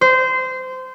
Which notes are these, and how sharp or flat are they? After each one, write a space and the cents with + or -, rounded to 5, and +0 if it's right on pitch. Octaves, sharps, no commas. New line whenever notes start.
C5 -20